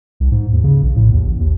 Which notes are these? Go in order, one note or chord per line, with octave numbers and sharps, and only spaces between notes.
C2
G#2
D#2
C#3
A#1
A2
D#2
A1
D#2